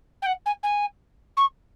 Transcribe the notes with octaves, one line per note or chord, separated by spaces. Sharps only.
G5
F#5
G#5
G#5
C#6